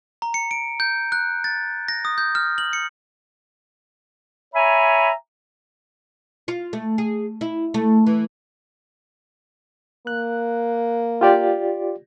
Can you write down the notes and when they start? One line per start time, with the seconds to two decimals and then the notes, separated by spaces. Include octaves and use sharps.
0.22 A#5
0.34 C#7
0.51 D7
0.80 G6
1.12 F#6
1.44 A6
1.88 A#6
2.05 D#6
2.18 G6
2.35 F6
2.58 F#7
2.73 C#7
4.54 C#5 E5 G#5 A#5 B5
6.48 F4
6.73 A3
6.98 G#4
7.41 E4
7.74 A3
8.07 E3
10.07 A#3 F#6
11.21 F4 G4 D5